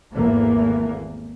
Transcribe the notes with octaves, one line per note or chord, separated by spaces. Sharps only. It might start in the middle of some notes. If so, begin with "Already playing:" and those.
G#1 E2 E3 A3 A#3